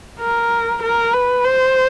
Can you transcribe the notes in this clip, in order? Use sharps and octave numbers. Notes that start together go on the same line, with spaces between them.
A#4
A#4
B4
C5